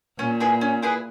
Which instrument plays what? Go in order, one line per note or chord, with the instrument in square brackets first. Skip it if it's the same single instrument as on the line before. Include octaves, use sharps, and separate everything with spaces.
[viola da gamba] A#2 [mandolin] C#4
[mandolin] E4 G#4 B4
C#4
E4 G#4 B4